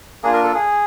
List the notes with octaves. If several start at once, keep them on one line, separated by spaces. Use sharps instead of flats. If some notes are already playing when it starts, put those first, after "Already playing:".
A#3 D4 F4 G#4
A#4
A4
G#4